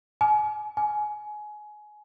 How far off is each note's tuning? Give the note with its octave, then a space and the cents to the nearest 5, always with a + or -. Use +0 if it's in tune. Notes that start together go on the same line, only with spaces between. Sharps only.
G#5 +35
G#5 +20